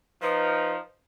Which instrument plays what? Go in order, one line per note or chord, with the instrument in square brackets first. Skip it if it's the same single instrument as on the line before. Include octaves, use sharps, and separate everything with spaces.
[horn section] F3 D#4 [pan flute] B4